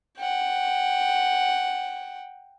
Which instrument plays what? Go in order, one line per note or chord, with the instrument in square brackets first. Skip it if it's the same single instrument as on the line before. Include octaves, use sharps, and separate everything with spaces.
[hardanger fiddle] F#5 G5